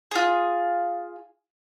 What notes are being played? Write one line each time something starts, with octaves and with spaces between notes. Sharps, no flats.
F4 G#4